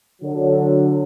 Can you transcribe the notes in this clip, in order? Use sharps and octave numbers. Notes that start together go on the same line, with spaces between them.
D3 F#3